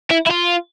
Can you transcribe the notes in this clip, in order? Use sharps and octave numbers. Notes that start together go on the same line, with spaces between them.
E4
E4
F4